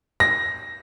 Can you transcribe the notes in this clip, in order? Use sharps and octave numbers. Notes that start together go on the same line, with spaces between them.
A#6